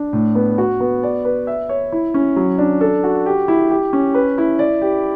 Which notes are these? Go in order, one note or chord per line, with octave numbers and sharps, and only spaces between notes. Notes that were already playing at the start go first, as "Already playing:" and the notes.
Already playing: D4
A2
B3
F#4
B3
D5
B4
E5
C#5
E4
C#4
F#3
D4
A4
F#4
G4
E4
G4
C#4
B4
E4
D5
G4